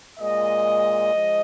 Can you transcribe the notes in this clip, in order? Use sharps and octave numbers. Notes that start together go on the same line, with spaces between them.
A#2 G#3 D#5
F3 G#3